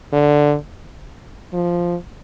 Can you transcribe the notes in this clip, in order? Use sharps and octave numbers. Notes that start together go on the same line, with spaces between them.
D3
F3